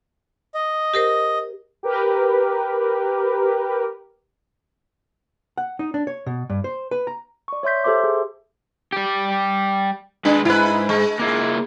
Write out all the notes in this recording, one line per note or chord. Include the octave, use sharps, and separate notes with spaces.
D#5
G4 A#4 C5
G4 A#4 B4
F#5
D#4
D4
C#5
B2
G2
C5
B4
A#5
D5 C#6
C#5 E5 C6 G6 B6
G4 A4 C5 E5 C6 D6
G#4
G3 G4
G#3 D4 B4
G#2 E4 B4
G#3
A#3 E4 F4